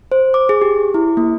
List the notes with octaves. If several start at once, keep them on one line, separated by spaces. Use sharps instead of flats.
C5
D6
G#4
G4
E4
A#3